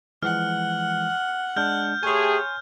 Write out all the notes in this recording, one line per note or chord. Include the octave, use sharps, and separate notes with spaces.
E3 F3 G#3 F#5 F6
G#3 D4 F6 G6
A3 G4 G#4 C#5 G#5 C6